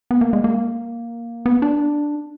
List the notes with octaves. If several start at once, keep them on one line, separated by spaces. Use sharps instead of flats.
B3
A#3
G#3
A#3
B3
D4